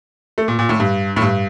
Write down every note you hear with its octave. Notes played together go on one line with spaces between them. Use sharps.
A3
A#2
A#2
A2
G2
A2
G2